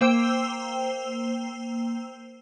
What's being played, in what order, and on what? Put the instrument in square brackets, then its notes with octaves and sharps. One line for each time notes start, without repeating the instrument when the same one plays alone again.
[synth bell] A#3 C5 G5 E6